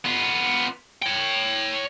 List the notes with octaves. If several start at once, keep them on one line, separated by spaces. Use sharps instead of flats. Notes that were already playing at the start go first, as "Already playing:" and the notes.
B3 F4
C#5 G5